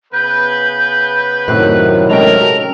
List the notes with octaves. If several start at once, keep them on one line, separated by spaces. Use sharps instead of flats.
C#3 B3 B4 G6
F#2 A2 C3 D#3 F#3 C4 F#6
G#3 C#4 A4 A#4 G5 F7